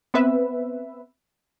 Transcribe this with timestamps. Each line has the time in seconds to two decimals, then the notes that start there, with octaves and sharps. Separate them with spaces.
0.14 B3 C4 B4 E5